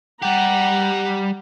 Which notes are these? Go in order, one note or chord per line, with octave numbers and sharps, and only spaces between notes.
G3 G4 F#5 A#5